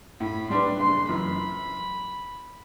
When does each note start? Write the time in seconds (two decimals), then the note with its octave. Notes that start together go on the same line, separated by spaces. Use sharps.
0.20 A2 B5
0.50 G3 D4 G4 B4 C6
0.79 F#1 C6
1.09 F#2 E3 B5